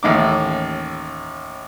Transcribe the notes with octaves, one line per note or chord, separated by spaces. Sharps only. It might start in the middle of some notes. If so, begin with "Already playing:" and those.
A1 D#2 D#4 D6